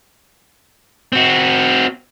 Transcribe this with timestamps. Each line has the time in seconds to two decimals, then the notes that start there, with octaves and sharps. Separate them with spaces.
1.13 C4 F#4